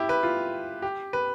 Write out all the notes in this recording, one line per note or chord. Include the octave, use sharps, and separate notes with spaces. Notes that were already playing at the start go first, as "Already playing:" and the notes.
Already playing: E4 G4
B4
F4
G4
B4